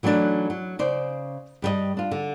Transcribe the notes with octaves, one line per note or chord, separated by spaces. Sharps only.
E3 F#3 A3 C4 D4 D#4
F#3
C#3 C5 D5
G2 G3 G#4 D#5
D4 F4
D3